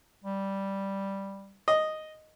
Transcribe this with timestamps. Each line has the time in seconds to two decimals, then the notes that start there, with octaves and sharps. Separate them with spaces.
0.24 G3
1.68 D#5